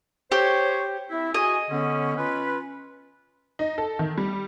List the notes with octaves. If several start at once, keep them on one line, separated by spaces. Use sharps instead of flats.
G4 C5 C#5
C4 E4
F#4 G#4 D#5 G#5
D3 B3 C#4
C#4 F4 B4
D#4
A4
D#3
G3